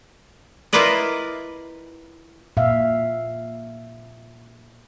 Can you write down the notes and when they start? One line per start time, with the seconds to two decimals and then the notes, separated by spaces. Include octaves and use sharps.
0.73 E4 F4 A#4 B4 D5 D#5
2.57 A#2 E5 F5